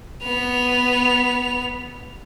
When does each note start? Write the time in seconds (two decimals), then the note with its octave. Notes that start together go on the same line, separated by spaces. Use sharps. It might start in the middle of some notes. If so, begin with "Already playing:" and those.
0.23 B3 F7